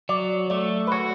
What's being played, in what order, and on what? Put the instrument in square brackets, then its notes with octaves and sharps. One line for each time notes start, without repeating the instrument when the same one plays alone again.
[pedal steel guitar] F#3 [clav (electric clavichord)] D5
[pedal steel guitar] A3 [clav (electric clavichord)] D5
[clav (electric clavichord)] B4
[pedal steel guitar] F#4 [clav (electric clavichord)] C#5